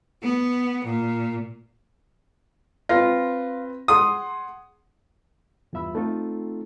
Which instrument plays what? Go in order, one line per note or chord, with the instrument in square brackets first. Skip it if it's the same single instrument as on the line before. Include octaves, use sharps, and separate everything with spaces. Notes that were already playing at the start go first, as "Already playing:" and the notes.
[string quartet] B3
A#2
[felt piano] C4 B4 A#6 [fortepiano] F4
[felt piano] G#4 F#5 C6 [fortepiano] D#6
[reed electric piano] E2 G2 F4 E5 B5 E6
A3 C4 D#4 F4 A4